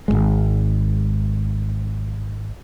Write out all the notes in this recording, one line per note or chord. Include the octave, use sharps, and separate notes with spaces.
G#1 D#2 G#3